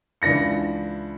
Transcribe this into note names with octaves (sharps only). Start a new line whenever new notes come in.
C#2 E3 D4 A#6 C#7